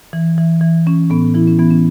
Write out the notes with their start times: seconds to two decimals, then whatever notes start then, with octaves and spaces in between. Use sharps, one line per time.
0.13 E3
0.38 E3
0.61 E3
0.86 E3 C#4
1.10 A2 B3
1.35 E3 E4
1.47 C#4
1.59 E3 B3
1.71 C#4